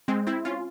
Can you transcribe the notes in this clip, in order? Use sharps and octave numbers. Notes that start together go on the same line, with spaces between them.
G#3 C4
C4 E4
C#4 F4